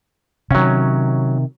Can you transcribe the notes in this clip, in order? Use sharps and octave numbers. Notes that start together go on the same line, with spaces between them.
C3 D#3 F#3 C#4